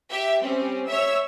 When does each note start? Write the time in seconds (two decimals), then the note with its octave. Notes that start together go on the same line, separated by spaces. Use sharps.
0.10 G4 E5
0.41 G3 C4 C#4
0.89 C#5 E5 E6